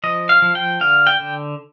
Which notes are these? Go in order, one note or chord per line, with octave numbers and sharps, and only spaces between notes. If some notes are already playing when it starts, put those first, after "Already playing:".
F3 D#5
F5
F3
G5
D3 F5
G5
D3